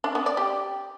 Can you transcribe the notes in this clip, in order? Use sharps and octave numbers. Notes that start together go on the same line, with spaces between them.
D4
B3
D5
G4